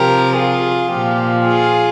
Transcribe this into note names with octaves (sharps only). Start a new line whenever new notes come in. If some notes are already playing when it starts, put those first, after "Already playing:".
Already playing: C3 F3 G4 A#4
F4 G#4
A#2 F3 G4
F4 G#4